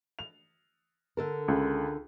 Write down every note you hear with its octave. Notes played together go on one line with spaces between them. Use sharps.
F7
D3 A4 A#4
C#2